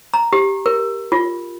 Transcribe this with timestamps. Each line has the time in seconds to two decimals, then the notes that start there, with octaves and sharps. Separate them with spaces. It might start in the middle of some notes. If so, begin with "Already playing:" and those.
0.14 A#5
0.33 G4
0.66 A#4
1.12 F4